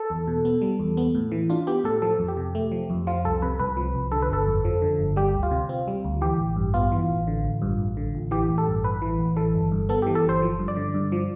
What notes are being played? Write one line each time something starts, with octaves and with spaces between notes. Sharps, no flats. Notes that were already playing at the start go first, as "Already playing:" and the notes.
Already playing: A4
E2
B2
B3
G3
E2
B3
A2
E3
D4 F4
B3 G4
A2 A4
F3 A4
F2
G4
C3
A3
F3
F2
F3 F4
C2 A4
C3 B4
C2 B4
F3
C2
D3 A4
B4
G1 A4
F2
F3
D3
G1
G3 G4
D2
F4
C3
C4
G3
D2
E3 G4
A1
G2
B3 F4
E3
A1
D3
A1
G2
A1
D3
A1
E3 G4
A1
A4
G2
A1 B4
E3
A1
E3 A4
G1
G2
B3 A4
E3 G4
A4
G1 C5
F3
G2
D5
D3
G2
F3